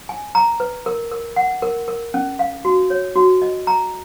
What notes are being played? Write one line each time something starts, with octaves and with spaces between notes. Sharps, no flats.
G#5
A#5
B4
A#4
A#4
F#5
A#4
A#4
C#4
F5
F#4
C#5
F#4
D#5
A#5